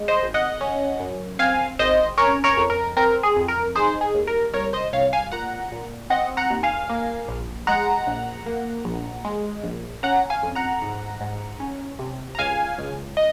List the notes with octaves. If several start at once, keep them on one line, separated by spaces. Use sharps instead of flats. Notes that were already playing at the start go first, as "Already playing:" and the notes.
Already playing: G#3
C5 D#5
G#1
D#5 F#5
C#4
F#2
C4 F5 G#5
G#1 C5 D#5
C#4 A#4 C#5
A#4 C#5
F2
A#4
C4 A#4
G#4
F2
A#4
D#4 G#4 C5
G#4
D#2
A#4
C2 A#4 C#5
C5 D#5
C2 C#5 F5
F5 G#5
A#2 F#5 A#5
A#2
C4 D#5 F#5
F#5 A#5
D#2
F5 G#5
A#3
A#1
G#3 F#5 A#5
A#1
A#3
A#1
G#3
A#1
C#4 F#5 A#5
F5 G#5
F2
F#5 A#5
G#2
G#2
C#4
C3
A#5
C#2 F5 G#5
C#2
D#5